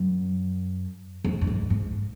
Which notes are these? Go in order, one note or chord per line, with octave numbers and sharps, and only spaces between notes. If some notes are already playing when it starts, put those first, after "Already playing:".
Already playing: F#2
F2
G2
G#2
G#2